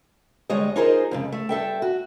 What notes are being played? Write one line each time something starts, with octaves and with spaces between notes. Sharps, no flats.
D2 G3 G#3 C#5 D#5
D#4 F4 G#4 A#4 C5 D#5
F2 G#2 C#3
A3
G2 A4 E5 G5
F#4